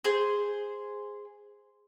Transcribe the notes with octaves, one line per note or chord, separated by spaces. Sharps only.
G#4 C5